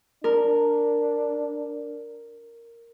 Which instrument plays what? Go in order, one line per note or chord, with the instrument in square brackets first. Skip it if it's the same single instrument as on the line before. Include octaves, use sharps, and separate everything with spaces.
[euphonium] D4 [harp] A#4